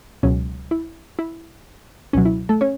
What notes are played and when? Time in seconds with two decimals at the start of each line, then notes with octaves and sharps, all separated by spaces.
0.23 C#2 B2 F#3 C#4
0.71 E4
1.19 E4
2.13 C#2 B2 F#3 C#4
2.25 E4
2.49 A3 A4
2.61 C#4 C#5